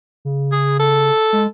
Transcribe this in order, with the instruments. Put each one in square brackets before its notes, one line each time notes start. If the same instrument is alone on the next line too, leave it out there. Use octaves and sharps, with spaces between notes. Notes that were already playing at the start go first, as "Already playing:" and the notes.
[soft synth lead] C#3
[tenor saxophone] G#4
A4
[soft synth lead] G#3